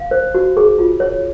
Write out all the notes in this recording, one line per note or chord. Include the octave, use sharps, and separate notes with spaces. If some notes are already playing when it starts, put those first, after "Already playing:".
Already playing: F5
C5
F#4
G#4
F4
C#5